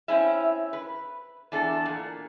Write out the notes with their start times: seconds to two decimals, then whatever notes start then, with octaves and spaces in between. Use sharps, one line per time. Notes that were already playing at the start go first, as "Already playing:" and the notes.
0.08 C4 C#4 E4 E5
0.73 B4
1.52 E2 D4 A4
1.85 A#2